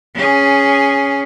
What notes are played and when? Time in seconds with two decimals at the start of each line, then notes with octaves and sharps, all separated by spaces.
0.15 C#4 G#4